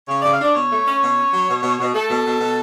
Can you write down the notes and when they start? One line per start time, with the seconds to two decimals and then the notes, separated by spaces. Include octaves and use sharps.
0.08 C#3 C#5
0.20 C#3 D5
0.31 F5
0.40 D4 D5
0.54 B2 C#5
0.71 A3
0.86 C#4
1.02 B2
1.17 C#4
1.32 F#3
1.48 B2
1.62 B2
1.79 B2
1.94 A3 A4
2.10 B2
2.25 B2
2.40 B2